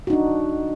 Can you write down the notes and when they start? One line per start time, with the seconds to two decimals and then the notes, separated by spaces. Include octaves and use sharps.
0.07 F#4
0.10 D#4
0.13 D4